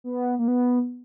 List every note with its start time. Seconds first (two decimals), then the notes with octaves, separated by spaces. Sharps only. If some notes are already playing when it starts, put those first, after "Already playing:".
0.04 B3
0.39 A#3
0.48 B3